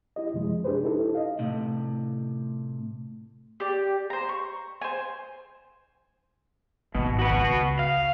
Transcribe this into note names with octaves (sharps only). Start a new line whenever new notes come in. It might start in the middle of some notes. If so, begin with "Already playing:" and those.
E4 G4 D#5
F#2 C3 F3 G#3
D4 G4 G#4 B4 C5
D#4 E4 G4 A4
D#5 F5
A2 C3
G4 D5
C5 A#5
C#6
C5 G#5
G#1 B2
F#4 B4
C#2
F5